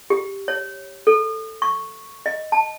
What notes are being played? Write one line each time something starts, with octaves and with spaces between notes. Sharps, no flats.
G4
C#5
A4
C#6
D#5
A5